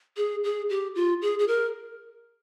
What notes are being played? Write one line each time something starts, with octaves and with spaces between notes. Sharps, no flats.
G#4
G#4
G4
F4
G#4
G#4
A#4